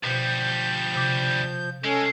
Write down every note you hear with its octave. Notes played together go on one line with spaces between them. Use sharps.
D2 B2 F3 G3 G6
C3 D6
G#3 C#4 A4